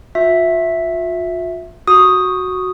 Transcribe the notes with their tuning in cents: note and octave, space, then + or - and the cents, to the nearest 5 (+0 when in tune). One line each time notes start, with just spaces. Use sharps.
F4 +45 E5 +0
F#4 +0 D#6 +0